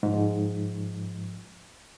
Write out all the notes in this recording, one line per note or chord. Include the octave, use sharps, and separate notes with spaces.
G#2 F3